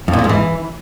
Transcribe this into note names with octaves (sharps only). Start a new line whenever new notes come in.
F2
A#2
F2
G#2
E3